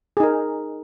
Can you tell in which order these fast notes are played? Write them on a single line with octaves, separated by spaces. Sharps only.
G#4 D#4 A#4